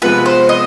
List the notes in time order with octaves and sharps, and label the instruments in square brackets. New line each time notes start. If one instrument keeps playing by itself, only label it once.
[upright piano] C3 F3 G#3 B3 F4 [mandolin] B4
[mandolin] C5
D#5